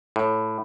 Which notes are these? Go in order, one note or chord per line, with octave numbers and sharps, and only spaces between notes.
A2